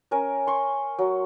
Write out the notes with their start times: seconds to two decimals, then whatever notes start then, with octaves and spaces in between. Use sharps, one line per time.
0.11 C#4 A#4 G#5
0.47 C6 C#6
0.98 F#3